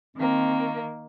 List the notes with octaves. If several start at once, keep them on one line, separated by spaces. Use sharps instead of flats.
D#3 A#3 C4